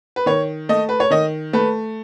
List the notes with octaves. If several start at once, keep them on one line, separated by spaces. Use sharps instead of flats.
B4
D#3 C#5
A3 D#5
B4
C#5
D#3 D#5
A3 B4